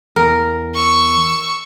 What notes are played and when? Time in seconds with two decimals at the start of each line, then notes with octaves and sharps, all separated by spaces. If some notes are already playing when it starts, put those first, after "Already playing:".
0.16 E2 A#4
0.74 C#6 E6